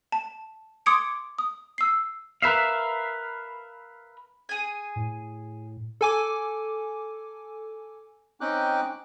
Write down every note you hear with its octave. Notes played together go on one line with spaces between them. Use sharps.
A5
C6 D6 D#6 G#6 C#7 D7
D#6
E6 C7
A#4 B4 E5 F5
G#4 G#5
A2
A4 G#5 D6
C4 C#4 D#4 G5 D6 F#6